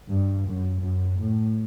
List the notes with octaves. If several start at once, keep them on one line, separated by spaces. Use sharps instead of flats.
G2
F#2
F#2
A2